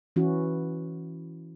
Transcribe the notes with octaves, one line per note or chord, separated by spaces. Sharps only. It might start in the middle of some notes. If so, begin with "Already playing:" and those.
E3 C#4 E4 F#4